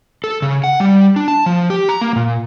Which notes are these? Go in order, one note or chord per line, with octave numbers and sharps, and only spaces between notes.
A4
C#3
F#5
G3
D4
A5
F3
G4
A#5
A#3
A#2